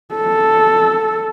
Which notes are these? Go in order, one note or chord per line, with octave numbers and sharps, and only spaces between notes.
A4